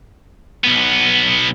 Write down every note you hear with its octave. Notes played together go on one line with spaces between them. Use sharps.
B1 B3